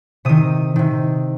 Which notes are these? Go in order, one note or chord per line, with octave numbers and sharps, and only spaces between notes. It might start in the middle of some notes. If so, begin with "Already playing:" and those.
C3 D#3 D#6
C3 D#3